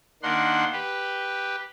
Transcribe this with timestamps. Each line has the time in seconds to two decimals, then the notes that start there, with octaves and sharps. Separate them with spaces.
0.23 D#3 A#3 D4 F#5 C6
0.73 G4 B4